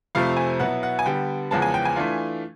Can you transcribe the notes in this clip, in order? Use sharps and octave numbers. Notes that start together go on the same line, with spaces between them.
F2 C3 F3 A3 C4 F5
G#5
B2 F#3 B3 E4 F#5
F#5
G#5
D3 G3 B3 G5
E2 C#3 F3 G#3 B3 A5
G#5
G5
G#5
E3 A3 D4 F4